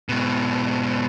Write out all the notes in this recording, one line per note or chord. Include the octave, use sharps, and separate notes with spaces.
G#2 B2